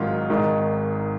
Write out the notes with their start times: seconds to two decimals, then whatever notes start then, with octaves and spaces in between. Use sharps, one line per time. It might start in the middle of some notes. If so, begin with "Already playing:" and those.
Already playing: G#1 G#2 D#3 F#3 F4
0.30 G#1 G#2 D#3